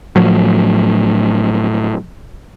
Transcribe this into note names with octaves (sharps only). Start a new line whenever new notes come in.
A2 F3 F#3